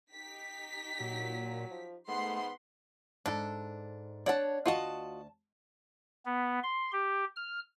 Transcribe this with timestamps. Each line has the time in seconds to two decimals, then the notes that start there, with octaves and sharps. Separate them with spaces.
0.13 D#4 G4 B6
1.00 A#2 F#3
1.70 F3
2.08 G#2 A3 B3 F#5 B5 C6
3.26 G#2 D4 A4
4.26 D4 C#5 D5 F#5 A5
4.66 D2 F4 F#4 D#5 A5
6.26 B3
6.63 C6
6.93 G4
7.36 F6